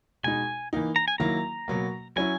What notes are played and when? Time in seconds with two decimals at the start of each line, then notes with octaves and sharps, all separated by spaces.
0.23 B2 G#3 D#4 G#5
0.73 E3 A#3 D#4
0.96 A#5
1.08 G#5
1.18 D#3 F#3 A#3 E4 A#5
1.68 B2 F#3 A#3
2.16 F#3 C#4 E4 G#5